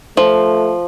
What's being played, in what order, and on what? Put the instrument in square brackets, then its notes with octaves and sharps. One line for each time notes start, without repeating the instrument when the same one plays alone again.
[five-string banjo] F3 [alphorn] A3